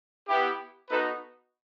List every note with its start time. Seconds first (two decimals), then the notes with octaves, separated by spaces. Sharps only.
0.27 B3 E4 G4
0.90 B3 D#4 F#4 A4 B4